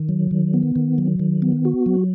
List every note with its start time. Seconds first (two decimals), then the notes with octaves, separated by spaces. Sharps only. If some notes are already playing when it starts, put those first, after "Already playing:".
Already playing: D#3
0.09 F#3
0.31 D#3
0.54 B3
0.76 D#3
0.98 F#3
1.19 D#3
1.42 B3
1.65 F#4
1.86 F#3